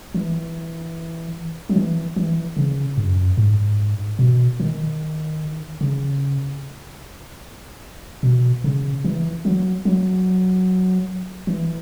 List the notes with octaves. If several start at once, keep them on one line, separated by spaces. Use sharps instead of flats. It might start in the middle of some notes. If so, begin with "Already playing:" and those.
E3
F#3
E3
E3
C#3
F#2
G#2
B2
D#3
C#3
B2
C#3
E3
F#3
F#3
E3